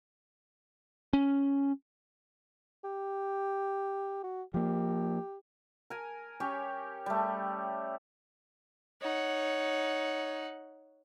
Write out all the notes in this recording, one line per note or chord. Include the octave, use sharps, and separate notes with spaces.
C#4
G4
F#4
F3 A#3 G4
A#4 G#5
C#4 G4 C#5
G3 A3
D#4 C#5 F#5